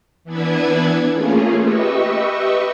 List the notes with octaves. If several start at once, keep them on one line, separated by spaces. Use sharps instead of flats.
E3 B3 D4 E4 B4 G#6
A3 A#3 C#4 F4 G#4
G4 B4 D#5 E5 C#6 E6